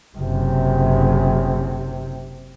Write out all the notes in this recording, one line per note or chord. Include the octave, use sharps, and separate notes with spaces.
F#1 C3